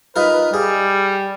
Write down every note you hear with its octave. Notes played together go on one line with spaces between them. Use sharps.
D#4 F4 A#4 B4
G3 G#4